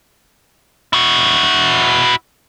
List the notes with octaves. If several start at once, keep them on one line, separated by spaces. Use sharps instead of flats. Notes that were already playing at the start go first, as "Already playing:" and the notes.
E4 F#4